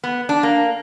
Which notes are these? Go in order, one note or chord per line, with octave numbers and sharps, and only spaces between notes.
B3
D4
A#3